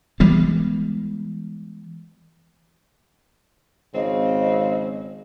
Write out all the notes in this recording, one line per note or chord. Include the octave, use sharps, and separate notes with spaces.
E3 G3 G#3 B3
G#1 C#3 C4 D#5